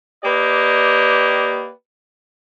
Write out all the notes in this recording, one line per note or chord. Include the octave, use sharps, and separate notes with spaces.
A#3 G4 B4 D5 D#5